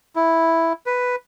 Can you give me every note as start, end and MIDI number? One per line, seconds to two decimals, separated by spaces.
0.16 0.73 64
0.86 1.16 71